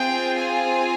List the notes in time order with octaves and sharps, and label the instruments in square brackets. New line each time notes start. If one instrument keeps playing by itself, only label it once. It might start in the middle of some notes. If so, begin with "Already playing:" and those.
Already playing: [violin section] C4 F4 G#4 G5
G#5